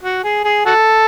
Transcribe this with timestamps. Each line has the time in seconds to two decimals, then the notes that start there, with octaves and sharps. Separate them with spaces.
0.03 F#4
0.24 G#4
0.45 G#4
0.66 F#4 A4